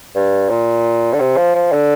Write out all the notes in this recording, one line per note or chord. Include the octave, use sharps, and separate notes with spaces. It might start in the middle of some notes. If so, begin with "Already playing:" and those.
G2
A#2
D3
C3
F3
F3
D3